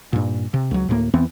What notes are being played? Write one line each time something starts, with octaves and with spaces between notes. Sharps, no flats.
G2 A#2
C3
C#2 F#3
D2 A2 F3 A#3
E2 E3 B3 C4